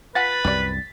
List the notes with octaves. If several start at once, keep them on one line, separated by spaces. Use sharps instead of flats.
F4 B4 F#5 G#5 A6 B6
C2 F#2 G3 D5